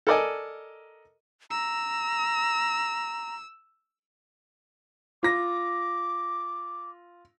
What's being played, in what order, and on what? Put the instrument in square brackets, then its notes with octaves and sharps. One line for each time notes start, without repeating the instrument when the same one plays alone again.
[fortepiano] A4 A#4 D5 D#5 G#5
[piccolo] A#5 [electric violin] E6
[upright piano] F4 A#6 [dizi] D6